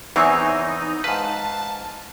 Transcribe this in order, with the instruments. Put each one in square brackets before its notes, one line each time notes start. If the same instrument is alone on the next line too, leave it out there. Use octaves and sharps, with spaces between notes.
[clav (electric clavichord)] E2 E3 C4 [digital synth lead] D#4 [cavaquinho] C#5 E5 G#5
[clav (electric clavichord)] G#2 B4 [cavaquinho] F5 [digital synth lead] A5